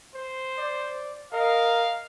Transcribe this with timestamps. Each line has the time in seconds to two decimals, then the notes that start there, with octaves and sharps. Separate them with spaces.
0.15 C5
0.58 D5
1.33 A#4 D#5 F5